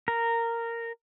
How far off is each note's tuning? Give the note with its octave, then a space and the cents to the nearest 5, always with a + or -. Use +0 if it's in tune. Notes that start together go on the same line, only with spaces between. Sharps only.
A#4 -10